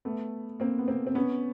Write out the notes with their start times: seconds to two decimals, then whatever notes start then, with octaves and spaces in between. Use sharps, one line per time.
0.05 A3 B3
0.60 A#3 C4
0.78 B3
0.88 A#3 C4
1.07 C4
1.15 B3 C#4